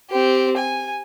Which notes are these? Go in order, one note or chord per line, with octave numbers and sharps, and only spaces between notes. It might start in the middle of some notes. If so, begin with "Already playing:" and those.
C4 G4
G#5